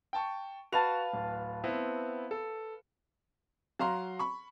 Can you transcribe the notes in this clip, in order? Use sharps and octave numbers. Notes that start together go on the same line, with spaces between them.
G5 A5 C#6
F#4 B4 F5 A5 F7
D1
B3 C4 E4
A4
F#3 F5 A#5 C6
B5 C#6